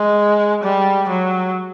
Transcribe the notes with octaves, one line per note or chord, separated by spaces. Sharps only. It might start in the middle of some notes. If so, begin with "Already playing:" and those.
Already playing: G#3
G3
F#3